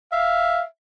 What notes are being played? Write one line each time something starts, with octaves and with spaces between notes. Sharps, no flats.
E5 F5